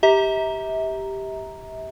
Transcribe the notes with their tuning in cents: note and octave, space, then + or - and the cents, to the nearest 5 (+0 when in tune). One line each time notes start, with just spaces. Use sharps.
G4 +0 E5 -35 A#5 +0